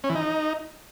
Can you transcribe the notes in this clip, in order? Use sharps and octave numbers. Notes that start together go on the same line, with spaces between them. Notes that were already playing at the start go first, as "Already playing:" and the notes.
C#4
E3
D#4